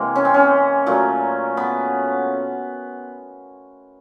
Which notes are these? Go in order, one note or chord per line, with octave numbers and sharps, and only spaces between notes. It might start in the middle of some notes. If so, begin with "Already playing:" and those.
Already playing: C3 E3 G#3 A#3
C#4
C4
C#4
A#2 F#3 A3
B3